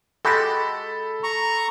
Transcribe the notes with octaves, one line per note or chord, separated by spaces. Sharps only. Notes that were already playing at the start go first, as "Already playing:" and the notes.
G#3 F#4 G4 A4 B5 A6
A#5 C#6